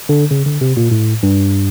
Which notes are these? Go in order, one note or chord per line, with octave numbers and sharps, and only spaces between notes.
D3
C#3
D3
C3
A#2
A2
G2